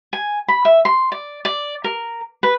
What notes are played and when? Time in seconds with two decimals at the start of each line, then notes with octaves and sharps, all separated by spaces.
0.13 G#5
0.48 B5
0.65 E5
0.85 C6
1.12 D5
1.45 D5
1.84 A#4
2.43 B4